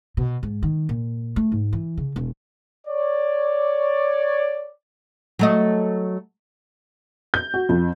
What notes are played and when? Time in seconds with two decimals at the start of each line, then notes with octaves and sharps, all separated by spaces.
0.17 B2
0.43 G#2
0.63 D#3
0.89 A#2
1.36 A3
1.52 G#2
1.73 E3
1.97 C#3
2.16 E1
2.88 C#5 D5
5.39 F#3 A3 D#5
7.34 G6
7.54 F#4
7.69 F2